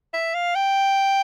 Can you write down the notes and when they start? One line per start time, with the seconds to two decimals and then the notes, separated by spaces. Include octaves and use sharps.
0.13 E5
0.34 F5
0.55 G5